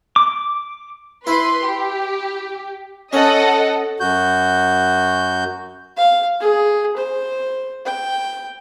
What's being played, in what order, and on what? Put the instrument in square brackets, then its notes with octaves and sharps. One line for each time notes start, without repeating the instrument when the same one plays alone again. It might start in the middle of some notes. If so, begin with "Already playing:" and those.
[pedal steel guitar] D6
[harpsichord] E4 [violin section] B4 C6
[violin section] G4
[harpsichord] C#4 [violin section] A4 D#5 F#5
[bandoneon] F#2 F#4 G6
[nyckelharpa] F5
G#4
C5
G5